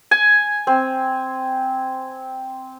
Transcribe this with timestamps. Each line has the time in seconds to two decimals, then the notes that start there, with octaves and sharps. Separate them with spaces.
0.11 G#5
0.67 C4